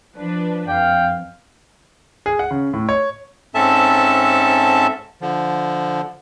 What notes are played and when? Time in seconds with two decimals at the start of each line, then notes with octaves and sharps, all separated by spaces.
0.17 F3 D4 B4
0.68 F2 F5 G5
2.26 G#4
2.39 F#5
2.51 C#3
2.74 A2
2.89 C#5
3.55 G#2 C4 C#4 A4 E5 A5
5.21 D3 F3